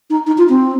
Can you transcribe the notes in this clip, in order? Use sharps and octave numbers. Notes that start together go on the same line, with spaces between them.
D#4
D#4
F4
C4